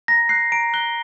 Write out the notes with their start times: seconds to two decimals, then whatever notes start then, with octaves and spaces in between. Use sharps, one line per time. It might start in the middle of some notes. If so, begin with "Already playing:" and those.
0.08 A#5 A#6
0.29 F#6 C7
0.52 A#5 D7
0.74 F#6 G7